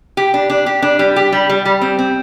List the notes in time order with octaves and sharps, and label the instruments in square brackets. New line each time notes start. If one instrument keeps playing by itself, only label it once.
[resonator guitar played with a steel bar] G4
D4
D4
G4
D4
G3
G4
G3
G3
G3
C4
C4